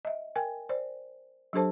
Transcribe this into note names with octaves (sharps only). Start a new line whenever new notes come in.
D#5 E5
A#4 G5 G#5
C5 D5
F#3 D4 G4 A4 C5 A5